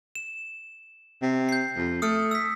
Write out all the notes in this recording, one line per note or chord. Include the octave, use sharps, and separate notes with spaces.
E7
C3
G6 C7
F2
A3 D#6 F6 C#7
E6 B6